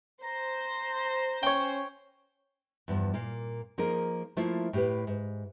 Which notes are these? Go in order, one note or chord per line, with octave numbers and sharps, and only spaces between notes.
C5 A#5
C#4 C#5 G5
E2 G2 F3
A#2 A#3
F3 A#3 D#4 G#4 A#4
F3 A3 A#3 E4 F4
A2 G4 B4
G#2